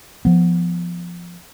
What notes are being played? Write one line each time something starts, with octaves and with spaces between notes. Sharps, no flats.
F3 B3